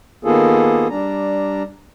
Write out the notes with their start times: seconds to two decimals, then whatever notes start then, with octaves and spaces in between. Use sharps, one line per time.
0.25 D#3 A#3 B3 F4 G#4 A4
0.90 G3 D4 A#5